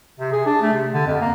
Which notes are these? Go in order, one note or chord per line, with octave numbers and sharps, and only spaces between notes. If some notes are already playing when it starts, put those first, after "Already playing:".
C3
G#4
D4
A3
C3
D3
F2
A#3